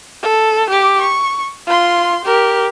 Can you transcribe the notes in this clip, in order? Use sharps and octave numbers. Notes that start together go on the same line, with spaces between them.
A4
G4 D6
C#6
F4 C6
G4 A#4